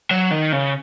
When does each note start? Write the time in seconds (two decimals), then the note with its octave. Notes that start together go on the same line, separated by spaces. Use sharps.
0.11 F#3
0.31 D#3
0.52 C#3